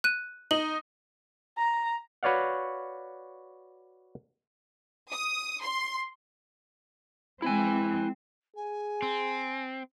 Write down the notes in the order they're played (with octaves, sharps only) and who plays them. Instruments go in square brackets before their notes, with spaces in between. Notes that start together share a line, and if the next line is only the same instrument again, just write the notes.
[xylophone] F#6 D#7
[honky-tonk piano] D#4 [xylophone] F#7
[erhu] A#5
[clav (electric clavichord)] F#4 B4 C#5 D5 F5 F#5
[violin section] D#6
C6
[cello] G#3 C4 [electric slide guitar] E4 G#5
[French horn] G#4 [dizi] G#5
[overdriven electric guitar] C4